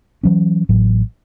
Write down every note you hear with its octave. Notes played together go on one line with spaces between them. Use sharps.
E3 F#3 C#4
A1 A2 F#3